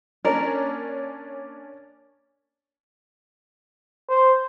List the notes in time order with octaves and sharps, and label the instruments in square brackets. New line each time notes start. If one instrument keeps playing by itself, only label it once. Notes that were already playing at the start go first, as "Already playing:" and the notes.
[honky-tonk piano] A#3 C#4 D4 [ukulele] A#4
[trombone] C5